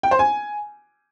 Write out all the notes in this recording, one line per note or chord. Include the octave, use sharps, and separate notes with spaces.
G5
C5
G#5